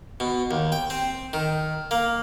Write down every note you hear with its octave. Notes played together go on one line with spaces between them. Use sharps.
B2
D#2
G5
C4
D#3
A#3